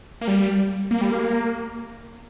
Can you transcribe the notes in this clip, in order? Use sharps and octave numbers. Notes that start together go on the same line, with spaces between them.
A#3
G3
A#3
G3
A#3